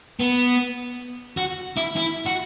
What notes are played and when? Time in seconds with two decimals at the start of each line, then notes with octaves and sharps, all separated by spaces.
0.20 B3
1.37 F#4
1.77 E4
1.96 E4
2.26 F#4